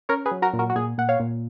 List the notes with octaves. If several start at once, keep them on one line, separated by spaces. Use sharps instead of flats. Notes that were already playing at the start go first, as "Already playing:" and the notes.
C#4 A#4 C#5
G#4 B4
F#3
F#4 A#4
A#2
F#4 A#4
F#4
A#2 G#4
A#2 F#5
C#5 F5
A#2